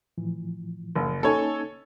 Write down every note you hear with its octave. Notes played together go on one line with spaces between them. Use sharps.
A2 E3 F3
F#1
A#3 C#4 D#4 A4 C#5 G#5